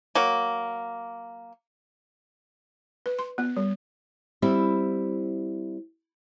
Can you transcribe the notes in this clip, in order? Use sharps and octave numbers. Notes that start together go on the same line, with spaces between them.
F#3 A#3
B4
C6
B3
G3
G3 C4 E4